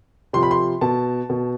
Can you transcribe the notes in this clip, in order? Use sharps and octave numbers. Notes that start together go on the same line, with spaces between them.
C3 F3 C6
B5
C6
B2 A5
B2